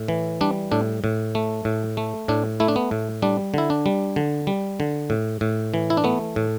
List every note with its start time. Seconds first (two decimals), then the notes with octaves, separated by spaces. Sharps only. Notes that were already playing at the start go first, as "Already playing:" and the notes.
Already playing: A2
0.08 E3
0.41 G3 D4
0.71 A2 D4
1.04 A2
1.35 A3
1.65 A2
1.97 A3
2.28 A2 D4
2.60 A3 E4
2.68 D4
2.76 B3
2.91 A2
3.22 G3 D4
3.54 D3 E4
3.70 D4
3.86 G3
4.16 D3
4.47 G3
4.80 D3
5.10 A2
5.41 A2
5.74 E3
5.90 E4
5.97 D4
6.04 A3 B3
6.36 A2